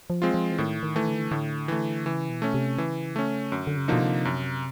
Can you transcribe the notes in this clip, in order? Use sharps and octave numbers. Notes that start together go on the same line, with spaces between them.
F3
G#3 C4 F4
F3
E3
A2 D#3
D#3
E3 A3
D3
D#3
D3
A2 D3
E3 A3
C#3 E3
B2
A3 C#4
C3
C#3 E3
A3 C#4
F#2 D3
D3
C#3
B2 D3 F3 A#3 D#4
C3
F#2